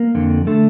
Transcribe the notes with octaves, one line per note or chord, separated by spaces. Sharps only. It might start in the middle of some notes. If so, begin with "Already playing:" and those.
Already playing: A#3
F2 D3
D3 A3